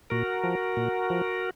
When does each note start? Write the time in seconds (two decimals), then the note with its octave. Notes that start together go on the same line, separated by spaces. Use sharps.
0.10 A#2 F#4 A#4
0.44 F3
0.77 A#2
1.10 F3